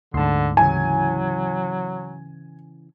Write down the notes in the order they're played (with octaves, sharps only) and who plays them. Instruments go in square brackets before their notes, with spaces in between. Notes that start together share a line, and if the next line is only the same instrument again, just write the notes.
[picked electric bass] D2 G#2 [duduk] D3 [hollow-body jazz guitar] A5 C6
[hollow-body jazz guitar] C#3 E3 E4 [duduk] F#3 [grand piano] G#5